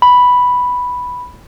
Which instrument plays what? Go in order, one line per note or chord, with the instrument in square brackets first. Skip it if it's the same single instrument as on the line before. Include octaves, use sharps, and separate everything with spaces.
[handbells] B5